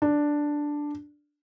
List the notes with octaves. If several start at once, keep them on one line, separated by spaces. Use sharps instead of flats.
D4